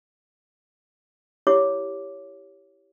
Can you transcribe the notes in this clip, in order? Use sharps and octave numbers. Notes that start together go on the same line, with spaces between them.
E4 G4 C#5 D6